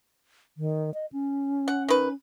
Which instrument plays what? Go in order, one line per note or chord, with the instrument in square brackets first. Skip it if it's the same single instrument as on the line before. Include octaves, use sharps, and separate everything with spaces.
[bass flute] D#3
D#5
C#4
[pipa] F#5
D#3 B4